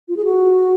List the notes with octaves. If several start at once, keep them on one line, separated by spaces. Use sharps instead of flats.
F4
G#4
F#4